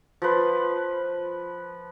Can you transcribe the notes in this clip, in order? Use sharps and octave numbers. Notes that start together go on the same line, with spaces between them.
F3 B4